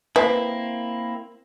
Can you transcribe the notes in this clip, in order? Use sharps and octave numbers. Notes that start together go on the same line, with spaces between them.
A#3 C4 E4 B4